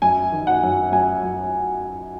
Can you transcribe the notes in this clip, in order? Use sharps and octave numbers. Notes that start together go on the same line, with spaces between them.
F#2 G#5
D#3
F#5
F#2
F#2 G#5
F#2